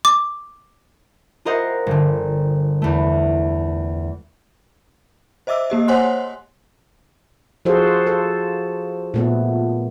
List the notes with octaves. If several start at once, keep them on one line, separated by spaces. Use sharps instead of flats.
D6
F4 G4 A#4 C5 D#5 F#5
G1 D3
E2 A3
C5 D#5 E5 D6 E6
A#3 G4 D#5
C5 C#5 F#5 G#5 C6 F#6
F3 F4 F#4 G#4 A4 C5
A4
A#2 A3 B3